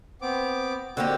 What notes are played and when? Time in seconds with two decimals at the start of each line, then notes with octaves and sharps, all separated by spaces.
0.22 B3 C4 D6
0.97 D3 A#3 C4 F#4 G4 E6